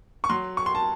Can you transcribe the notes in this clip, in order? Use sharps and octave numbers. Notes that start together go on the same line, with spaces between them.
C#6
F#3 C6
C#6
C6
A5